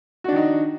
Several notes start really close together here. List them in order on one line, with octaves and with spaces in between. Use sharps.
F#4 D4 D#3 D#4